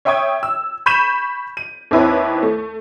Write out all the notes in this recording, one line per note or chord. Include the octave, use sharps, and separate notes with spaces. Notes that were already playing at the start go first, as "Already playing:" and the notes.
C#5 E5 G5 C#6 D#6 G#6
E6
B5 C#6 G6 B6 D#7 E7
D#7
D#2 C4 E4 B4 C#5
A3